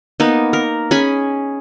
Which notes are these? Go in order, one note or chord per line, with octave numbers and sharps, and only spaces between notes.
A#3 B3 D#4
A#4
C#4 G#4 B5